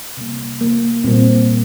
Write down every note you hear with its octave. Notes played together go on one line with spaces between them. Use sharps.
C3 G3 A#3
A#3
A#2 G3 A#3 C4